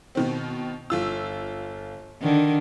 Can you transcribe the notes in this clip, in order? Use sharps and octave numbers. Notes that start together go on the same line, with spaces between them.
B2 D#3 C4
G1 F4 E6
D3 D#3